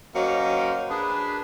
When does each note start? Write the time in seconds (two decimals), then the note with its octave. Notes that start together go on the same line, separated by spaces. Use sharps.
0.15 F#3 A#3 C#4 C5 D#5
0.89 D4 G#4 A#4 B4